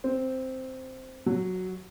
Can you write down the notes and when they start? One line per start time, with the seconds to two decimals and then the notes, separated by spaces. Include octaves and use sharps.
0.04 C4
1.26 F#3